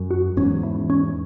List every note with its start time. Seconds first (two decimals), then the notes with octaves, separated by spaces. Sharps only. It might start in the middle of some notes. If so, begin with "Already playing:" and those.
Already playing: F#2
0.11 F#4
0.37 E2 G#2 C#4
0.63 E3
0.90 C#4